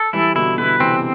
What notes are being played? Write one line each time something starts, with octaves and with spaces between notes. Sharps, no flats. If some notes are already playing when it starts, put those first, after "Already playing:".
Already playing: A4
E3 G3 E4
B2 D3 E4
B2 D3 B4
C3 E3 C4